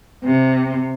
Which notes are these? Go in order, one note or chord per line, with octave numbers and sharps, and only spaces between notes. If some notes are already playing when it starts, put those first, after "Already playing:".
C3